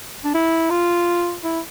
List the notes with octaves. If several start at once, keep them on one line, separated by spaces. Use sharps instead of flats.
D4
E4
F4
E4